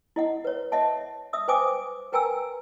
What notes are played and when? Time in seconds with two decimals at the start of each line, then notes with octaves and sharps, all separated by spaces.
0.16 E4 D#5 F#5
0.45 B4 C#5
0.72 C#5 D#5 E5 F#5 A5
1.33 E5 D#6 E6
1.48 B4 C5 G5 G#5 D6 D#6
2.12 A#4 B4 G5 G#5 A#5 E6